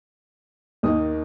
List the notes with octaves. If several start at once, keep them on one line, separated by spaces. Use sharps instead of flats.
D#2 D#3 A#3 D#4 D#6